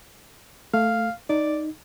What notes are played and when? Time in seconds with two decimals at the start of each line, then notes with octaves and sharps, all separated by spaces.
0.74 A3 F5
1.29 D#4 D5